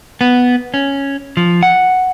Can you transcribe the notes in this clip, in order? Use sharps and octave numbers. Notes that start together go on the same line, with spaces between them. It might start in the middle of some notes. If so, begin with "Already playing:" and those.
B3
C#4
F3
F#5